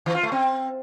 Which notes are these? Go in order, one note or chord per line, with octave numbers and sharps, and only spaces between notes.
E3
F4
A3
C4